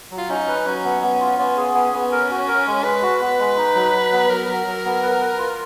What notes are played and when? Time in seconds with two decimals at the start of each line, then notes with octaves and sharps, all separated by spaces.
0.11 F#3
0.18 F4
0.29 C#4 D#4
0.48 B4
0.66 F#3 C#4
0.84 B3
1.02 B3
1.20 F4
1.39 B3 C#4
1.57 G#4
1.75 B3
1.93 B3
2.12 A#4
2.30 F#4
2.48 A#4
2.67 G#3
2.84 G#3 B4
3.02 F#4
3.21 B3
3.39 G#3
3.57 D#4
3.75 F#3
3.94 F#3
4.12 B3
4.30 F#3 A#4
4.48 F#3
4.67 F#3
4.85 B3
5.02 B4
5.21 B4
5.39 F4